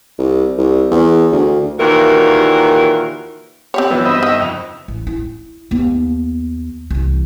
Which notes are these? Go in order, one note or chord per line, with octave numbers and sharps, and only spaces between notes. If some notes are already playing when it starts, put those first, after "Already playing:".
C2
C2
E2
D2
D#2 A#2 E3 F#4 G4 A#4
C4 G4 C#5
A#1 E3 F#3 B3 E6 G6
G2 C5 D#5 E5 B5
D#3
F#1 F2 F7
A1
E4
D#2 B3
C2 E3